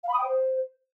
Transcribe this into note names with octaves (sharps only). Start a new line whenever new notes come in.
F5
B5
D#6
G5
C5